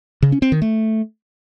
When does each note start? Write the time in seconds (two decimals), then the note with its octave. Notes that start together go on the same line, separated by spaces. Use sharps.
0.22 C#3
0.32 C#4
0.42 C4
0.52 D#3
0.62 A3